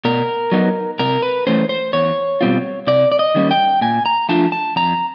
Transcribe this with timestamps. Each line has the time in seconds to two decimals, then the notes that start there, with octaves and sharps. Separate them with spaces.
0.05 B2 A#4
0.52 F#3 B3 D#4
0.99 C3 A#4
1.22 B4
1.47 E3 A3 C#4 C5
1.69 C5
1.93 E2 C#5
2.41 B2 G3 C4 F4
2.87 C3 D5
3.12 D5
3.19 D#5
3.35 D#3 G3 A#3 C#4
3.51 G5
3.81 A#2 G#5
4.06 A#5
4.29 F3 A3 D4 F4 A5
4.52 A5
4.76 F2 A#5